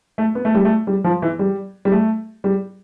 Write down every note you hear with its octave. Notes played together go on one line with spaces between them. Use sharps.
A3
B3
A3
G3
A3
G3
F3
E3
G3
G3
A3
G3